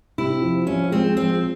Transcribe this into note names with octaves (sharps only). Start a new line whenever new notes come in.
C3 E4
F3
F3 C#4
G#3 C4
F3 C4